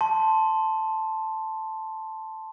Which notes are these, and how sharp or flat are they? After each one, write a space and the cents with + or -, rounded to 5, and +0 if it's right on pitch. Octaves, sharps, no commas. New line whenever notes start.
A5 +0 C6 +5